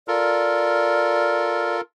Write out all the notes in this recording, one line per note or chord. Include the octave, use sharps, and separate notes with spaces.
F4 A4 A#4 D5